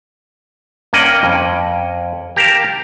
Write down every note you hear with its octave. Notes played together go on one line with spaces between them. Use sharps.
G2 A#3 C#4 D#5 F#5 G5
F2
G4 A#4 F5 A5